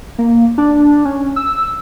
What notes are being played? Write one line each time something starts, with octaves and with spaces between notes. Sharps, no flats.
A#3
D4
C#4
E6